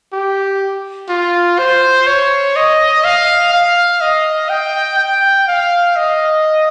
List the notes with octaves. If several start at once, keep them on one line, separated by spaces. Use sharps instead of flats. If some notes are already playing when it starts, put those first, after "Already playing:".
G4
F4
C5
C#5
D#5
F5
F5
D#5
G5
G5
F5
D#5